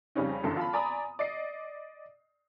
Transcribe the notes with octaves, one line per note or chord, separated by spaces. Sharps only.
F2 C#3 G3 C4 C#4 D#4
G1 F#2 D3 E3 A4
F4 A5 B5
D5 G#5 A#5 B5 D#6
D5 D#5 C7